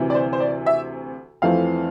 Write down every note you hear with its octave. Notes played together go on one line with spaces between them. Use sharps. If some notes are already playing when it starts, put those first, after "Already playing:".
Already playing: D2 C3 E3
D5
C5
C5
D5
E5
F2 E3 A3 C4 F5